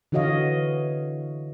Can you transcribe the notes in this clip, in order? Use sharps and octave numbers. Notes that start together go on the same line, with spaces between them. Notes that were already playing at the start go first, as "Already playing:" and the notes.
D3 E3 F#4 C#5 D#5 F5